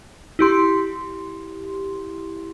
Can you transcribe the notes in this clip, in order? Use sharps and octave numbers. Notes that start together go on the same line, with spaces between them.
E4 G4 C6